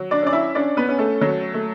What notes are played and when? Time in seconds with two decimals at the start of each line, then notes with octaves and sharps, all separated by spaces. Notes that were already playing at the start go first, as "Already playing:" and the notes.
Already playing: F#3
0.11 D4 D5
0.22 C#4 D5
0.33 E4 E5
0.55 C#4 D4 D5
0.77 B3 B4
0.89 C#4
0.98 A3 A4
1.21 F#3
1.54 A3